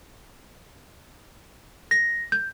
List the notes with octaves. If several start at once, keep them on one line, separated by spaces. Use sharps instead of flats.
A#6
G6